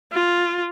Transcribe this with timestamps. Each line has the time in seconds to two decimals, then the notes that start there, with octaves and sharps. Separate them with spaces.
0.12 F4